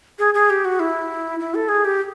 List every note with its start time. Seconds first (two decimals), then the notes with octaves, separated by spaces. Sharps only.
0.19 G#4
0.34 G#4
0.50 G4
0.65 F#4
0.80 E4
1.40 E4
1.55 A4
1.69 G#4
1.85 G4